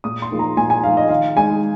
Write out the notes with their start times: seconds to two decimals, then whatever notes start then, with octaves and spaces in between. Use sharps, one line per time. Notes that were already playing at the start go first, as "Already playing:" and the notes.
0.04 A#2 D#6
0.22 C6
0.31 F3 A#3 D#4
0.39 A#5
0.57 A#2 G#5
0.70 G#5
0.83 F3 A#3 D#4 F5
0.97 D#5
1.09 D#3 F5
1.36 G#3 D#4 G#5